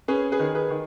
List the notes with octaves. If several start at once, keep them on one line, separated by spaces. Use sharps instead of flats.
C#4 G#4 B4
G#4 B4
D#3
G#4 B4
D#3